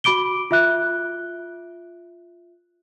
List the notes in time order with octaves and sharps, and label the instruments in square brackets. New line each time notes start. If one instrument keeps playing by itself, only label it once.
[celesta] F#4 B5 D6 D7 G7
F4 E5 F#6